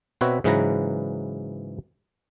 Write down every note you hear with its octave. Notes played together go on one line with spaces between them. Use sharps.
B2 C4 F#4 B4 C#5 E5
G#2 C#3 E3 F#3 B4 A#5